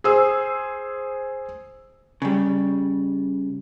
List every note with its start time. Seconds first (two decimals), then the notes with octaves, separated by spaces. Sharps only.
0.04 G#4 C5 E6
2.22 C#3 G3